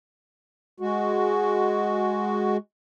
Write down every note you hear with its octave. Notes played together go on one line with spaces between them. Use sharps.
G#3 F#4